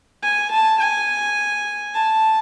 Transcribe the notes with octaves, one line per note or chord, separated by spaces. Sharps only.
G#5
A5
G#5
A5